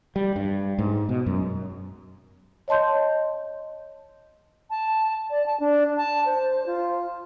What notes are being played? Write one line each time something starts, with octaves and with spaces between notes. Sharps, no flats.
G3
G2
G#2
B2
F#2
C#5 D#5 A5 C6 G6
A5
D5
A5
D4
A5
C5
F4